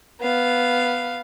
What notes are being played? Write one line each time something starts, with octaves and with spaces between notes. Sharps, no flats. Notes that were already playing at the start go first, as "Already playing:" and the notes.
B3 F5